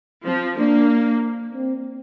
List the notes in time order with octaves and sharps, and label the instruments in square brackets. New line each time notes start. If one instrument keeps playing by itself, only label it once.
[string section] F3 [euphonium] C4
[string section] A#3 [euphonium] D4
[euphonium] C4